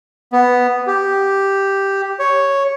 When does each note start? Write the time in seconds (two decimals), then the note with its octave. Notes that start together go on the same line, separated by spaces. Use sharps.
0.33 B3
0.87 G4
2.19 C#5